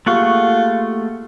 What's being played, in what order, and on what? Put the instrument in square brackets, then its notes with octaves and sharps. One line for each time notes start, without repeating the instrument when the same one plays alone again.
[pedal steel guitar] A3 F#5 C#6 [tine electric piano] A#3 G4 G#4 [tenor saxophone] F4